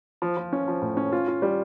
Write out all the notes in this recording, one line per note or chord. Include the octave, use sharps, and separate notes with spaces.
F3
F3
C#4
F3
A2
C#4
F4
F4
G3